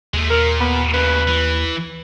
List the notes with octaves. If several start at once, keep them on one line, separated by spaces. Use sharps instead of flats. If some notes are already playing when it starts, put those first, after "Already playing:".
D#2 G#3 A3
A#2 A#4
B3
D2 C#3 B4
E3